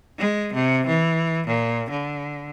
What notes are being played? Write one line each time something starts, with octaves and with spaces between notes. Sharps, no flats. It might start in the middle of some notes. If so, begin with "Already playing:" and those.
G#3
C3
E3
A#2
D3